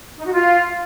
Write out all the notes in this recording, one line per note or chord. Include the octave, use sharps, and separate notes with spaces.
D#4
F#4
F4